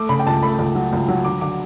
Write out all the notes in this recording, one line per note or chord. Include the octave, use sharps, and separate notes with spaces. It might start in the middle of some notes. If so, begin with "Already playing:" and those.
Already playing: A3 D6
C#3 B5
G5
C#2 A5
A3 B5
C#2
F#3
C#2
F#3
D3 D6
D3 D6